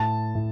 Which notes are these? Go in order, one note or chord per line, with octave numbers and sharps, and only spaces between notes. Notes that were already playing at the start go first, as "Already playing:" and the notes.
Already playing: A2 A5
A2